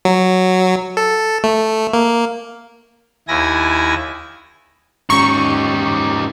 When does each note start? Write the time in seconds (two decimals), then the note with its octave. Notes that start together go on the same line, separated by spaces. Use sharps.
0.05 F#3
0.97 A4
1.44 A3
1.93 A#3
3.28 D#2 E4 G#5 A#6
5.10 G#2 C#4 D#4 G4 C#6